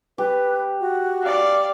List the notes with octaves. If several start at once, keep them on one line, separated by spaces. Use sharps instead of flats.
G4 B4
F#4
D5 F5